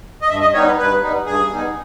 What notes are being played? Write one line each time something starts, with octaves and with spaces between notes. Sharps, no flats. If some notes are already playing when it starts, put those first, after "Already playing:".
D#5
G2 E5
D#5
G3 B3 D#4 C#5
B4
G2 B4
G3 B3 D#4
G2 G#4
G3 B3 D#4